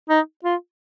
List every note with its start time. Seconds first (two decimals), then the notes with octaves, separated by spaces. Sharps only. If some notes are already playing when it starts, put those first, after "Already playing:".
0.09 D#4
0.44 F4